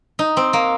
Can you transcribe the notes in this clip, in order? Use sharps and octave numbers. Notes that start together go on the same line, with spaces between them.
D#4
C4
A#3